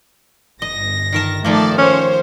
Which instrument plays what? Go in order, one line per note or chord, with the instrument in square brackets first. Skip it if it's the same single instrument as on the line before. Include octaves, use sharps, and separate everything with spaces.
[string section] G1 A#6 [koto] D#5
[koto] D#3 A#4 A5
[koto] D#3 F3 A#3 [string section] A3 A4 D5
[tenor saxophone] C#4 [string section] C5 C#5